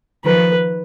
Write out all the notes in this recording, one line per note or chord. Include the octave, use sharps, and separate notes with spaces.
D#3 F3 B4